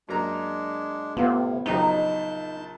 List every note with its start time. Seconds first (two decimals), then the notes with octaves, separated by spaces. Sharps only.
0.09 F#2 G#3 A#3 D4 A#5
1.17 A2 C3 B3 F4
1.66 A#1 C#3 F#3 C4 C#4 D#4 A5 G6